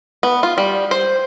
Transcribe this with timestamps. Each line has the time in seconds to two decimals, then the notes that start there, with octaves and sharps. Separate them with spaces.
0.23 B3
0.43 F4
0.58 G3
0.91 C5